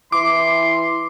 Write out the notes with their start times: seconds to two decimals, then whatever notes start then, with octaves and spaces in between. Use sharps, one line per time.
0.12 E3 E4 C6 D6